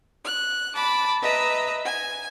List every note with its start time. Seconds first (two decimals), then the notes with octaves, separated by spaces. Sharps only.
0.24 F#6
0.74 A5 B5 D6
1.22 B4 D#5 E5 A#5
1.85 G#5